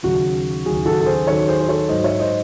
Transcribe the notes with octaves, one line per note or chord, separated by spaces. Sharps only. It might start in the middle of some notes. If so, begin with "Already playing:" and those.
D#2 C#3 F#3 F#4
D#2 C#3 F#3 G#4
F#4 A4
A4
G#4 C5
D#2 D#3 F#3 A4 C#5
G#4 C5
C5
A4 C#5
G#2 F#3 C5 D#5
C#5 E5
C5 D#5